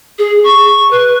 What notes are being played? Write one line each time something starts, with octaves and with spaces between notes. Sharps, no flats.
G#4
C#6
B4